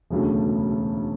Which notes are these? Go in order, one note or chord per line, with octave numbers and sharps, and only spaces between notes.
E1 D2 C#3 F#3 A3